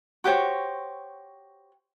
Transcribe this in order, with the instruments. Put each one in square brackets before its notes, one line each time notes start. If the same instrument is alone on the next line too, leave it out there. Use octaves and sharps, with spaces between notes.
[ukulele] F#4 G4 C5 C#5